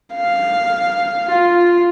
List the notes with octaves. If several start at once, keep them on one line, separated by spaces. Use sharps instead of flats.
F5
F4